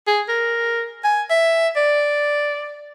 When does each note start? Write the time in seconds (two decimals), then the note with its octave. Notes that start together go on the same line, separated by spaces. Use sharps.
0.07 G#4
0.29 A#4
1.04 G#5
1.30 E5
1.76 D5